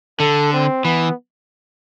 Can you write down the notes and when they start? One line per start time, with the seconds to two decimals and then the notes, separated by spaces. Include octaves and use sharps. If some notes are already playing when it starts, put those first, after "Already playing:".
0.20 D3 A4
0.53 C4
0.85 E3 B3